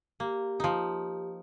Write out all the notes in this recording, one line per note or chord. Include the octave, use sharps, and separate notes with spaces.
A#3 G4
F3 D#4